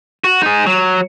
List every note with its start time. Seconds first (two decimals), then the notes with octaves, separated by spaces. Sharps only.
0.24 F#4
0.42 D#4 G#4
0.66 F#3